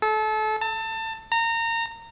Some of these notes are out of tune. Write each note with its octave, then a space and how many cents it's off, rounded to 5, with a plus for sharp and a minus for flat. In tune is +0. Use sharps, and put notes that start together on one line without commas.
A4 -30
A5 +25
A#5 -25